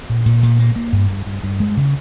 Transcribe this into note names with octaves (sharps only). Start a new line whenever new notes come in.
A#2
A#2
A#2
A#3
A#3
G2
G2
G2
G2
G#3
C#3